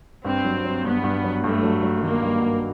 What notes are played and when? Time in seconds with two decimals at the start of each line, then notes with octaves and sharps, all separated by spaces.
0.25 G2 C4
0.45 F#3
0.64 F#3
0.84 G2 B3
1.04 G2
1.24 F#3
1.44 G2 A3
1.63 F#3
1.83 F#3
2.02 D#3 A#3
2.22 G2
2.42 G2